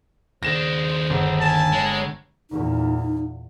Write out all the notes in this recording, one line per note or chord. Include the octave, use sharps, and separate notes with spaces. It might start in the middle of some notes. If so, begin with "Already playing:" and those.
D#2 D4 G#4 C5 A#6 E7
G1
G#5 A5
G#3 C#5
E2 A#2 D#4